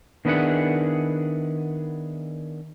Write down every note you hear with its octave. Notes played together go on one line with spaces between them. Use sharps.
D#3 B3 D4 E4 G#4 F#5